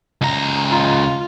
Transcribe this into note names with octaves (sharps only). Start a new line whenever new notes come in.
C#2 A#5
F4